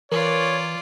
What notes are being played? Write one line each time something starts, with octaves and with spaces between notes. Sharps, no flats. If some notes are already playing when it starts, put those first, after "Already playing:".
E3 F4 A#4 C#5 D5